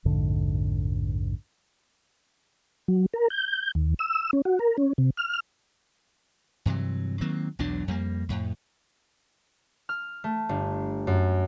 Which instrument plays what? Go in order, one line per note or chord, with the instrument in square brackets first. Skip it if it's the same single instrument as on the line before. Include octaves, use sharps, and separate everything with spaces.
[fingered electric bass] A#1 F2 G#2 D3
[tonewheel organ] F#3
A#4
G6
D#2
E6
C#4
F#4
A#4
C#4
C3
F6
[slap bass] G2 C3 E3 F#3
D#3 F#3 A#3 C4
B1 E2 F#3 D4
F2 G3 A#3
F2 A2
[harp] F6
A3
G1
F#2